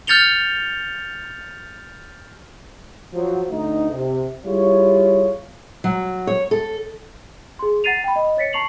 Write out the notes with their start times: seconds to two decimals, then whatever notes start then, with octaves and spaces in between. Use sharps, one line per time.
0.07 F6 G6 A6 C#7 F7 G7
3.14 F3 F#3
3.50 D2 D#4
3.91 C3
4.45 G3 E4 F4 G#4 C#5
5.84 F#3
6.27 C#5
6.51 A4
7.59 G#4 C6
7.84 F#5 A#5 A6 C7 D#7 F7
8.04 G5 B5
8.16 D#5
8.37 C#5 A6 B6 C#7
8.53 A5 A#5 C#6 C7 F7 F#7